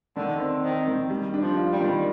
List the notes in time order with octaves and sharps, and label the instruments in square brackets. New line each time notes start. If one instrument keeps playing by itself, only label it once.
[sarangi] D3 [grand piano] D#3
[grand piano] C4
[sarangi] D#3 [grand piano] C4
[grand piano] D#3
G3
D4
[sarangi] F3
[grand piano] F4
[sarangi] G3
[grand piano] D#3